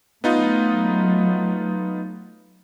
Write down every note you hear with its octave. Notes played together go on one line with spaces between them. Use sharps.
F#3 A3 B3 D#4 F4